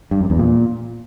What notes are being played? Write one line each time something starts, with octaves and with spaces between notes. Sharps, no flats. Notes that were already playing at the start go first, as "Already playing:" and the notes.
G2
F#2
E2
A#2